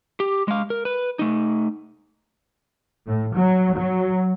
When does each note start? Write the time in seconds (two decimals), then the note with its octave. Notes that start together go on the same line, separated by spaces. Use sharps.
0.20 G4
0.48 G#3 F5
0.70 A#4
0.85 B4
1.19 A3 D#4
3.06 A2
3.36 F#3
3.75 F#3